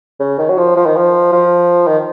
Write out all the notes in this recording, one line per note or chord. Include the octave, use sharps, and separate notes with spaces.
C#3
D#3
F#3
F3
F3
D#3
F3
F3
D#3